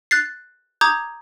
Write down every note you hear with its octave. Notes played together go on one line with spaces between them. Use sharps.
F#6 A6 C7
A#5 D6 D#6 G6 G#6